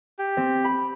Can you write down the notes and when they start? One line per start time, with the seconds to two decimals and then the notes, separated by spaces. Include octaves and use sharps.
0.19 G4
0.37 C4
0.64 B5